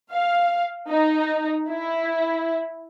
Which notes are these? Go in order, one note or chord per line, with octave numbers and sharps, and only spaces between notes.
F5
D#4
E4